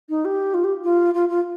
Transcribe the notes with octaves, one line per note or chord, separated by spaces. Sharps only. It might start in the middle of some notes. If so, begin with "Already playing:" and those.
D#4
G4
F4
G4
F4
F4
F4